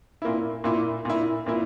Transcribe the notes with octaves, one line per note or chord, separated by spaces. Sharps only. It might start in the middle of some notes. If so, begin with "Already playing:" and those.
A#2 A#3 E4
A#2 A#3 E4
A#2 A#3 E4
A#2 A#3 E4